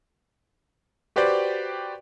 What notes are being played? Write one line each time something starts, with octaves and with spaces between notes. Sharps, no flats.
F#4 G4 B4 C5 D5 G5